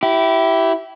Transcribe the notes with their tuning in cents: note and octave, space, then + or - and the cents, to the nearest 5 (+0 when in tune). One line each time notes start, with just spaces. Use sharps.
E4 +0 G4 -25